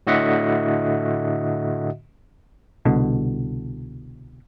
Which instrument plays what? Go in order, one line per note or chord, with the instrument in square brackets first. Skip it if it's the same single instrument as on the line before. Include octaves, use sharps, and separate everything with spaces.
[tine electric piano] A2 D3 F#4 D#5 E5 F#5
[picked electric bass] C2 B2 D3